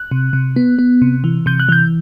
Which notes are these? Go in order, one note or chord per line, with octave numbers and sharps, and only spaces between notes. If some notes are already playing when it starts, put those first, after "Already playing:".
Already playing: F#6
C3
C3
B3
B3
C3
E3
C3 G6
F#6
E3 G6